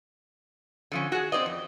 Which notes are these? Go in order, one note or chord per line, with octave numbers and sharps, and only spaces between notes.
D3 F3 C#4
F#4 G#4
C4 C5 D5 D#5
F2